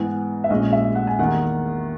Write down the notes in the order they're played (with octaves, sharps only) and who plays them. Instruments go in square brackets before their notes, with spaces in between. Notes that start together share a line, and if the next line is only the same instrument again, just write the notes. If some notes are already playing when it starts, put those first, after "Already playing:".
Already playing: [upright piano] G#2 E3 B3 G#5
E5
A#1 A#2 G#3 C#4 D#5
E5
F#5
G#5
E2 D#3 A#3 F#5